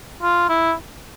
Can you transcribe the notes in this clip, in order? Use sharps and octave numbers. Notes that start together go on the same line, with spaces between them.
F4
E4